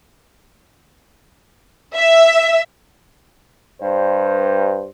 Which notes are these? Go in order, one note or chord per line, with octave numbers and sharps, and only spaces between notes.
E5
G2 C5